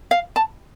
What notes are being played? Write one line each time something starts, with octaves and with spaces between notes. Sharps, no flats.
F5
A5